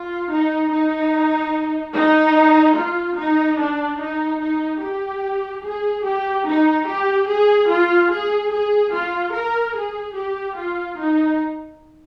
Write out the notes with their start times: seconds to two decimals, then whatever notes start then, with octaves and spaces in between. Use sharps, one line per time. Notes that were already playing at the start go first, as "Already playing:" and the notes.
Already playing: F4
0.30 D#4
0.71 D#4
1.94 D#4
2.76 F4
3.18 D#4
3.59 D4
4.00 D#4
4.41 D#4
4.82 G4
5.64 G#4
6.05 G4
6.47 D#4
6.88 G4
7.29 G#4
7.70 F4
8.11 G#4
8.52 G#4
8.94 F4
9.34 A#4
9.76 G#4
10.17 G4
10.58 F4
10.99 D#4